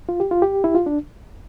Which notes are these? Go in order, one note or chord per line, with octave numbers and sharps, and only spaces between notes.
F4
G4
F4
G4
E4
F4
D4